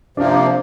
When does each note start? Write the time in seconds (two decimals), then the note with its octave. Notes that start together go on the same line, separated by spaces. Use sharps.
0.17 C3 F3 A#3 D4